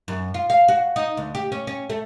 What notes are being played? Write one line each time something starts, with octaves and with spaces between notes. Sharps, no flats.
F#2
F4
F5
F#4
D#4
D2
G4
C#4
C#4
A3